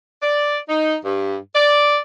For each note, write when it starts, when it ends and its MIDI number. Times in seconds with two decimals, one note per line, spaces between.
0.22 0.58 74
0.69 0.96 63
1.04 1.36 43
1.54 1.98 74